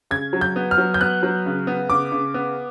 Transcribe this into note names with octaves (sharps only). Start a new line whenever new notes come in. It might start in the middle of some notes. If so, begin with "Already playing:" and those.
C#3 G#6
F#3
G6
B3
F6
F#3
G6
B3 F#6
F#3
C#3
B3
C#3 D6
C#3
B3